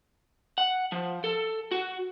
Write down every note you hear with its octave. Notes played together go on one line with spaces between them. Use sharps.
F#5
F3
A4
F#4